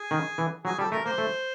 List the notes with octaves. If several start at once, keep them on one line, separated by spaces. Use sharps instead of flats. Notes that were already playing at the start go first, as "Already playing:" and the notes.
Already playing: G#4
D#3
E3
F#3 G#4
G3 A4
A3 A#4
A#3 C5
A3